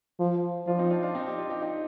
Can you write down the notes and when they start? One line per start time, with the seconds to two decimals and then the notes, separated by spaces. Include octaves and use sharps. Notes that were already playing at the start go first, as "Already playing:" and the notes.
0.20 F3
0.67 F3 D4 F4
0.79 C4 D#4
0.90 D4 F4
1.03 D4 F4
1.15 C4 D#4
1.26 D#4 G4
1.38 D4 F4
1.50 D#4 G4
1.62 D#4 G4